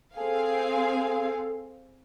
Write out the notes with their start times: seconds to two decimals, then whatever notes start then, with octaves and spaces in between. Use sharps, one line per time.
0.17 C4 G#4 A4 F5